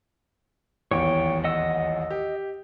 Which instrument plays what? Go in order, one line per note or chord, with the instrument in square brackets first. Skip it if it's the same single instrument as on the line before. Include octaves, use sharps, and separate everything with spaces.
[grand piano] D#1 A1 E2 [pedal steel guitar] C#5 G5
[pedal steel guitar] D#5 F#5 E6
[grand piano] G4